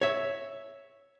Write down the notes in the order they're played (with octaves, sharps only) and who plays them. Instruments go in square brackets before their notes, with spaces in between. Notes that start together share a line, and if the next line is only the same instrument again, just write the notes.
[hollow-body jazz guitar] C#5 E5